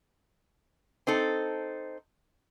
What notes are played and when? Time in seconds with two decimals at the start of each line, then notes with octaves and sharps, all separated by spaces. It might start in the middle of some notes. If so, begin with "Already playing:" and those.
1.07 C4 D#4 A4